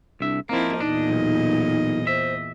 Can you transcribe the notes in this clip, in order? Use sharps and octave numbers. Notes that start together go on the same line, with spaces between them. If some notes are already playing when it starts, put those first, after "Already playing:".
C2 D4 E5
F3 A#3 C4 D#4 E4 A#4
E2 A#2 D4 D#4 D#5
B1
C5 E5